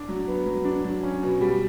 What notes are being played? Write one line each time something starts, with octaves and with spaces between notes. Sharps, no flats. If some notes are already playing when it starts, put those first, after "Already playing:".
Already playing: D4
F#3
B3
F#3
D4
F#3
C#4
B2
G3